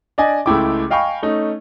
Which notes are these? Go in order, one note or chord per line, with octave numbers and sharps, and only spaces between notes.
D4 D5 D#5 G#5
C#2 G#3 A3 E4 G5 D6
D#5 F5 G5 G#5 B5 C#6
A3 C#4 D#4